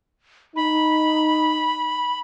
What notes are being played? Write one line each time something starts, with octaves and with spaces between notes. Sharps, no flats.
D#4 B5